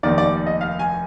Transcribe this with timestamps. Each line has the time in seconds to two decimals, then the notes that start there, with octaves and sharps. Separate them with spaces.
0.03 F1 D#2 D#3 D5
0.18 D5
0.46 D#5
0.61 F5
0.79 G#5